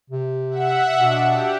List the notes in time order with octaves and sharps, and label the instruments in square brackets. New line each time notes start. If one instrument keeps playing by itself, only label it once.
[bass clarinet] C3
[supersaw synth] E5 F#5
[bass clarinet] B2 [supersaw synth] D4
[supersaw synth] G4